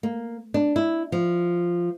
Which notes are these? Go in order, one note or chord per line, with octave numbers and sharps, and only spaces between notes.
A#3
D4
E4
F3